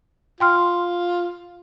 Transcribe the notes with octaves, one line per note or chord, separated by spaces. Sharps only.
F4 G5 C6 F6